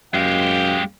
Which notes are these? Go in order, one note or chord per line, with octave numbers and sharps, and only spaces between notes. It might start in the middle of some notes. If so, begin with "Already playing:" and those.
F#2 G#3 G4 F5 G5